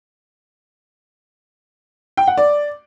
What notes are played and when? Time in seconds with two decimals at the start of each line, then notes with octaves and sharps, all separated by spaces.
2.17 G5
2.28 F#5
2.38 D5